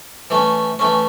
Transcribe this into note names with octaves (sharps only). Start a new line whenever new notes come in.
E3 A3 C#4
E3 A3 C#4